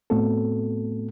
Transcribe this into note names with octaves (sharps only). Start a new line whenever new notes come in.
A2 A3 B3 C4 F#4 A4